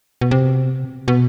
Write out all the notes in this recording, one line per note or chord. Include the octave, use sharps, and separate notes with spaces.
B2
C3
B2